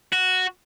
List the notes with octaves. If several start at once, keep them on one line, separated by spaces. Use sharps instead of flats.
F#4